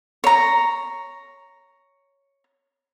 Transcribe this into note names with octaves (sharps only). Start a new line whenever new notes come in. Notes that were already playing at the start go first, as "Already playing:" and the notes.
C#5 A#5